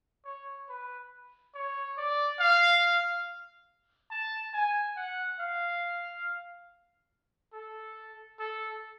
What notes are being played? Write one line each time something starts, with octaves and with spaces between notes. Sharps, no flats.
C#5
B4
C#5
D5
F5
A5
G#5
F#5
F5
A4
A4